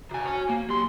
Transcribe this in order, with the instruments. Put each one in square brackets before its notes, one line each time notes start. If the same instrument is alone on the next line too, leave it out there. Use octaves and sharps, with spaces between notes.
[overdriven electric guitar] C3 G#5 [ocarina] F#4
[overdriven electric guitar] C#5 G#5
A#3
[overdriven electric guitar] B1 C6 [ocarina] G4